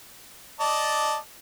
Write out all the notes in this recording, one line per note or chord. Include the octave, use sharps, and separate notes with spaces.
D5 D#5 A5